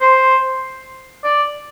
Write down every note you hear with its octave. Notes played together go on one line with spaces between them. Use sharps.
C5
D5